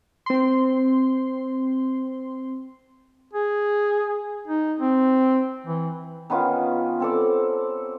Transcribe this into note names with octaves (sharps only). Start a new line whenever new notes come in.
C4 C6
G#4
D#4
C4
E3
D#3 B3 C#4 F4
C4 A4 D5